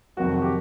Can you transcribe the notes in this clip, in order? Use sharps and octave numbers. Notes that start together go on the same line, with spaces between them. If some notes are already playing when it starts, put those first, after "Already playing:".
F2 C3 D#3 F#3 F#4
F#4
G4